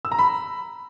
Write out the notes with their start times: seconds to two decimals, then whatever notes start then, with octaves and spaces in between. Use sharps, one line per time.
0.05 E6
0.12 A#5
0.19 B5